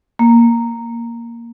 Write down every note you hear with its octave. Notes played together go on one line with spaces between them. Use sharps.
A#3